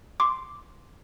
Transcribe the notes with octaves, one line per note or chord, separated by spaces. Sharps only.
C6 D6